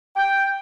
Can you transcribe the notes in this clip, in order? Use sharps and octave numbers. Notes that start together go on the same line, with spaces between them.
G5